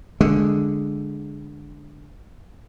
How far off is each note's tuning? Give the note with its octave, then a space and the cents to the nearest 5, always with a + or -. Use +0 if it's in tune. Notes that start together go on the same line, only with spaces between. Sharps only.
D3 +0 G#3 +0